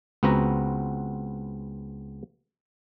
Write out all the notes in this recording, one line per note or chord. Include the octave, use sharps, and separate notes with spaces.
C#2 B3 C4 F#4 B4 A#5